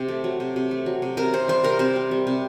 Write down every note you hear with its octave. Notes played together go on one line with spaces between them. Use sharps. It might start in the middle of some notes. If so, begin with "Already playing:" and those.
Already playing: C3
A3
F#3
C3
C3
A3
F#3
C3
C3 A#4
C4 C5
G3 C5
C3 A#4
C3 C5
C4
G3
C3